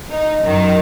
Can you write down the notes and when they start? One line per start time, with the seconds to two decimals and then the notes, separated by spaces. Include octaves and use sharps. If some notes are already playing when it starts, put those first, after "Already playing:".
0.11 D#4
0.41 F#2 D#3 F#3